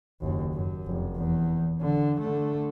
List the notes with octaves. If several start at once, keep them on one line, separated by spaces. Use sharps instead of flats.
F#1 D#2
F#2
F1
E2
D3
D3 A3